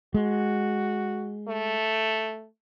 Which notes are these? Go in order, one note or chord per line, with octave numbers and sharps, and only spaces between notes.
G#3 F#4
A3